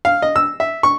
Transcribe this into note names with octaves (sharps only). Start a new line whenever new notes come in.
F5
D#5
E6
E5
C#6